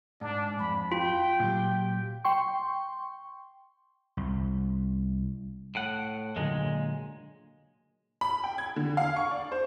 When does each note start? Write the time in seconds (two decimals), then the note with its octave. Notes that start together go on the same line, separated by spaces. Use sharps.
0.21 G#2 D4
0.59 F2 B5
0.92 F4 G5
1.40 A#2 F#3 G4
2.25 G5 C6 C#6
4.17 C2
5.75 A2 F#5
6.36 A#2 D3 F#3 G#3 A#3
8.21 B5
8.44 G5
8.58 G#6
8.76 D3
8.97 F5
9.16 C#6
9.31 D5
9.52 C5